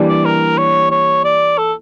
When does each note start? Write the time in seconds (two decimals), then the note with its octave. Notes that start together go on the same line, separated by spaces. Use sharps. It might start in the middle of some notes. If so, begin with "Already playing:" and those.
Already playing: E3 G3 A#3 D4
0.09 D5
0.25 A#4
0.58 C#5
0.91 C#5
1.25 D5
1.58 A4